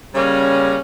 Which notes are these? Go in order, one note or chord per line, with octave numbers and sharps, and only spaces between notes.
C#3 G3 A#3 C#4